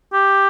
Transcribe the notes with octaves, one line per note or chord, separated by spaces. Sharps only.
G4